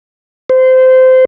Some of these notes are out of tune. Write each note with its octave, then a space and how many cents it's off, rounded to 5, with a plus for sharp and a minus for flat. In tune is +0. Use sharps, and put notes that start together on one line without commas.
C5 -20